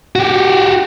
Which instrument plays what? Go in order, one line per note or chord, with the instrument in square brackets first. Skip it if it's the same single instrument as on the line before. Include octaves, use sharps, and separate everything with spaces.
[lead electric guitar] F#4 G4